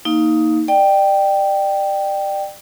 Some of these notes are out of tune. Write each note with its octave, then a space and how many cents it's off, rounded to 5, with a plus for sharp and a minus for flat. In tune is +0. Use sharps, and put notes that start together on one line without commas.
A#3 -10 D#4 +15 F5 +0
D5 +30 G5 +0